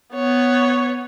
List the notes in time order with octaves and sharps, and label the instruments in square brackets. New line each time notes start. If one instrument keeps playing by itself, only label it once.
[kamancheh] B3 C#5